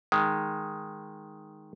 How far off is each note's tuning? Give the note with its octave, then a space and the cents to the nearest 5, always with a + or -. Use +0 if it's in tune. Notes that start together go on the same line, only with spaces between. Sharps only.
D#3 +0 G#3 +0